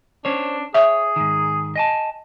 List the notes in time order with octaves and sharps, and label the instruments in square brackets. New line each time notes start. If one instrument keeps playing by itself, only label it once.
[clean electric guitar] C#4 C5 C#5 [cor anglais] D4
[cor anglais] G#4 [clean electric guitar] C#5 [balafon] E5
[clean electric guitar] G#2 D#3
D#5 G#5 A5